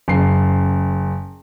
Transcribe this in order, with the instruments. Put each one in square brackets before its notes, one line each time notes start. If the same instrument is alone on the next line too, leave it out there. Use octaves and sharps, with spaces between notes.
[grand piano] F#1 C7